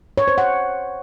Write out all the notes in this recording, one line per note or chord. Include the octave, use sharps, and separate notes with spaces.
C#5
C5
F#5